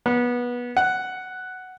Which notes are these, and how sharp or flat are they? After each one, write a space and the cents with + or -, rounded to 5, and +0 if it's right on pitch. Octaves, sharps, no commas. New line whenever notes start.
B3 -20
F#5 +5